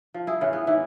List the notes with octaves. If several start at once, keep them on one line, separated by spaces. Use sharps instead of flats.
F3
E4 G#4
A2 C#3 E3
B3
G#2 E3 E4